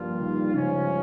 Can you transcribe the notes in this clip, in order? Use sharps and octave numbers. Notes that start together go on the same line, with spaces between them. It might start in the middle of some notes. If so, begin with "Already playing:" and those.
Already playing: G2 F3 G3 A#3 F4
D#3
G2 C#3 F3 G#3 C#4